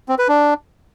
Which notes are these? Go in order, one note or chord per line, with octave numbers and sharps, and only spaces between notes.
C4
B4
D4